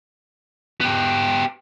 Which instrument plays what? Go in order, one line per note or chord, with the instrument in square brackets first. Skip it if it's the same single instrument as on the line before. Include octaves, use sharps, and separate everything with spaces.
[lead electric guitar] B3 G4